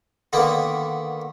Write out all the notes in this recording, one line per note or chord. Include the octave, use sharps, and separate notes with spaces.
D3 D#3 A#3 B3